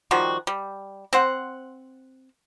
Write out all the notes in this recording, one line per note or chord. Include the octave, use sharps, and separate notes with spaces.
D#3 F3 G3 F#4
G3
C4 C5 F#5